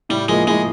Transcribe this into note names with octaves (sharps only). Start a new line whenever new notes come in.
A2 G3
F3 G#3 A#3
A2 G#3